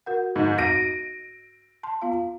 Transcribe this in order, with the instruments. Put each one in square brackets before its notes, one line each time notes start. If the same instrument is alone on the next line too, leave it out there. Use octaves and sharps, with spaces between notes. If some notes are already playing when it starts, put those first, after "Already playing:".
[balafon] F#4 A#4 F#5
[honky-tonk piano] G#2
[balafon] F#4 [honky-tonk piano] A#6 D7 D#7
[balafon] A5 C6
B3 F4 F5